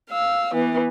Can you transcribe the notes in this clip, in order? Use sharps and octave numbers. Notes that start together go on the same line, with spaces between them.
F5 E6
E3 B3